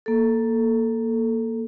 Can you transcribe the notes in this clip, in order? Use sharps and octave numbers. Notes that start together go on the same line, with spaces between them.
A#3 A4